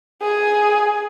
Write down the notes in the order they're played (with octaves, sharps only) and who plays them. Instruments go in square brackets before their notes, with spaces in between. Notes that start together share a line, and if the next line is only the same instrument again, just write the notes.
[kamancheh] G#4 G#5